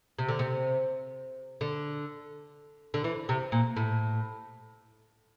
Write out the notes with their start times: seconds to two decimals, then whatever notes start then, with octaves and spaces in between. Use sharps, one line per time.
0.19 C3
0.28 D3
0.39 C3
1.61 D3
2.94 D3
3.04 E3
3.29 C3
3.52 A#2
3.76 A2